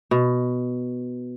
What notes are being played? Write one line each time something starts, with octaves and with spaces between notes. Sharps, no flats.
B2